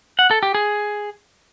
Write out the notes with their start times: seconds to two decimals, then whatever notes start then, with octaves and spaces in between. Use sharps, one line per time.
0.19 F#5
0.31 A4
0.43 G4
0.55 G#4